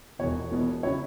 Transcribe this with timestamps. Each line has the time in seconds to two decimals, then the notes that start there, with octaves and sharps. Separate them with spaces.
0.19 E1 E2 B2 C#5
0.51 E1 E2 B2 B3
0.83 C#3 F#3 E4 C#5